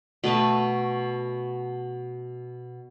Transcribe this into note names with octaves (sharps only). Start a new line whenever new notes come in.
B2 A3 B4 A5